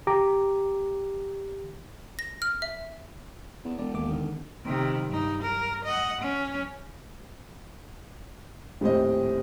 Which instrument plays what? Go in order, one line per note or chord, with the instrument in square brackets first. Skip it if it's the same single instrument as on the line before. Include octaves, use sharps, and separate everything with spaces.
[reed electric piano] G4 A#5 D6
[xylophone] A#6
F6
E5
[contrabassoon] E2
[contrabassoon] E1 [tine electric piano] D5
[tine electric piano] D#2 A#3 D6
D3 D#3
[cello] C3 D#3
G2 D#4
A#4
D#5 F#5
C#4
[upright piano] D#1 A2 C4 D#5